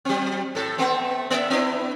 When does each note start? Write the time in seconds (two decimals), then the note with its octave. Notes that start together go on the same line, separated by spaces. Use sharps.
0.05 F#3 C4
0.55 A2 A4
0.78 A3 B3 C4
1.30 A#3 D5 E5
1.50 B3 D4 E4